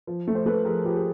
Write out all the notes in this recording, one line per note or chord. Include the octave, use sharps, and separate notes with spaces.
F3
A3
C5
A3 A4 B4
F3 G#4 A#4
F3 G4
G#4